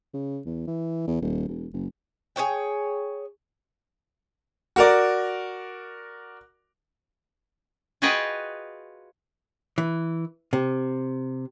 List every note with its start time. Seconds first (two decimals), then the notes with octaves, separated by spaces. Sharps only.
0.14 C#3
0.46 E2
0.67 E3
1.08 E2
1.22 D#1
1.48 E1
1.73 F#1
2.36 G#4 C5 C#5 G5
4.76 F#4 A#4 D5
8.02 F4 F#4 G#4 B4 D#5 G5
9.78 E3
10.53 C3